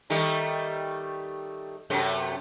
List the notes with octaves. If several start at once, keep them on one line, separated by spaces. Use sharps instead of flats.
D#3 G3 A3
F#2 C3 A3